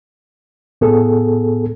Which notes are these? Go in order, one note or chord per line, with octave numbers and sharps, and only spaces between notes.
A2 B3 G#4 A4